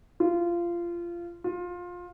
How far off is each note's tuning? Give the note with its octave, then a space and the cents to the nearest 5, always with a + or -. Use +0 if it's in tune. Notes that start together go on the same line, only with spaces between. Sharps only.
F4 -20
F4 +20